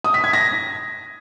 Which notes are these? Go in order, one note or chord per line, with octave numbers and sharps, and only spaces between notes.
D#6
B6
G#6
A#6